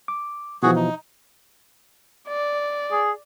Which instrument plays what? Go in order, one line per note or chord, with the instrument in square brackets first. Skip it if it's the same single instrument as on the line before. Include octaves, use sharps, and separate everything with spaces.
[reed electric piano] D6
[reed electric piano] B2 E3 F3 [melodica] F#4 G#4
[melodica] D#4
[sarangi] D5
[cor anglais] G#4